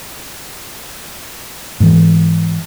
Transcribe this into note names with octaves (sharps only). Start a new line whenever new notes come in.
G#2 E3